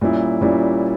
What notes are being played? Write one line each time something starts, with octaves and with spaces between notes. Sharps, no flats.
A#2 G3 C#4 E4
A#2 G3 C#4 E4